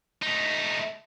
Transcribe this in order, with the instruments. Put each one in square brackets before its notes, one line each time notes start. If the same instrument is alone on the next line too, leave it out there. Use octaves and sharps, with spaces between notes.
[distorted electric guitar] A3 D#4